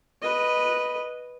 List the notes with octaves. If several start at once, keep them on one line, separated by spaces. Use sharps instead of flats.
B4 D#5